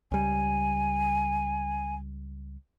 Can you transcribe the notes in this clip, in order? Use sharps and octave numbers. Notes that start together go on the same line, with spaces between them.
C#2 G3 G#5